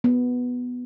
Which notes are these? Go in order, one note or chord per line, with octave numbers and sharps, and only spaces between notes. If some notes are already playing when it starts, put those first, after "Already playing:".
B3